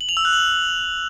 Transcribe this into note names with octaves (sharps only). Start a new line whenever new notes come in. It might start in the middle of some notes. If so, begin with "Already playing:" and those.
F#7
F7
E6
F#6
F#7